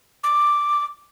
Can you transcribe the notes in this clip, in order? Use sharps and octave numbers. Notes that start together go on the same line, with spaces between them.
D6